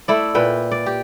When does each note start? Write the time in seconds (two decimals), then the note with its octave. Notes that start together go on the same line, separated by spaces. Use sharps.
0.08 A3 E4 D5
0.35 A#2 B4 G5
0.71 D5
0.86 G4